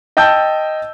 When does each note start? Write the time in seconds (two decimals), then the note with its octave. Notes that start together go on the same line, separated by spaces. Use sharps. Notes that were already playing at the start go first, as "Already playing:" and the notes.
0.17 D#5 G5 A5 E6 G6